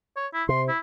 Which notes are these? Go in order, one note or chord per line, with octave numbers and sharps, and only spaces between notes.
C#5
E4
C3 C6
E4